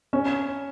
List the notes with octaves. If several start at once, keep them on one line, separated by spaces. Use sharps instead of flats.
C#4